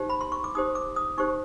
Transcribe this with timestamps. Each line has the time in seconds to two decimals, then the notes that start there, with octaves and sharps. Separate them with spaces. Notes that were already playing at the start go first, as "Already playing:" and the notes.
Already playing: D#4 G4 C5
0.10 B5
0.21 C6
0.32 C#6
0.44 D6
0.55 D#4 G4 C5 D#6
0.75 D6
0.96 D#6
1.17 D#4 G4 C5 C#6